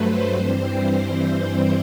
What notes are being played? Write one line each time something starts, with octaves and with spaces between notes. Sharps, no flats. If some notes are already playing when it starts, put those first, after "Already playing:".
Already playing: G2 F#3 A3 B4 C5
G2 E3 G3 C4 C5